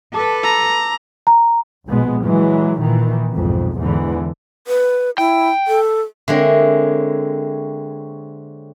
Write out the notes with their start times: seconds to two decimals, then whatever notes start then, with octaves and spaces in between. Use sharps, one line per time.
0.14 A4 B4 A5 D6
0.44 A#5 E6
1.27 A#5
1.87 A#1 B2 G#3 B3
2.25 E3 F#3 G#3
2.81 A#2 D#3 E3
3.34 B1 F2 G#2
3.78 E2 G#2 D3 E3
4.67 B4
5.18 E4 G5
5.67 A4
6.28 D3 G#3 A#3 C4 C#5 E5